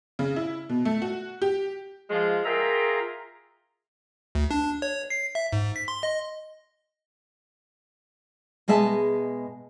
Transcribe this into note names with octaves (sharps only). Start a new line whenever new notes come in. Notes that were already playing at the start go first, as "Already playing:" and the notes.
C#3
E4
B2
A3
F#4
G4
F3 G#3 F4
F4 G#4 A#4 E5 G5 A#5
D2
D4
C#5
C7
E5
G#2
B6
C6
D#5
B2 G#3 G#4 E5 A5